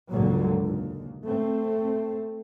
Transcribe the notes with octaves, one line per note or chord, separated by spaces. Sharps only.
C#2 G2 A#2 D3 F#3 A#3
D#2
A3 C4